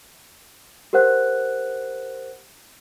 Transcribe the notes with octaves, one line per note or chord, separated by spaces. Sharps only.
G4 A#4 C5 F#5 F#6